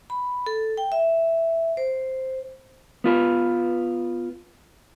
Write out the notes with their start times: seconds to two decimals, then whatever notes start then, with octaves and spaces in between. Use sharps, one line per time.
0.10 B5
0.46 A4
0.77 G5
0.92 E5
1.77 C5
3.04 B3 F4 B4